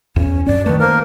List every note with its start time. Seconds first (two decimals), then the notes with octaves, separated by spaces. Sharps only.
0.16 E2 C#4
0.46 F#2 C#4 D5
0.66 D#3 A3 B4
0.80 A#3 A#4 C5